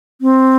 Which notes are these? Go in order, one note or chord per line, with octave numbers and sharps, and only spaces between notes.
C4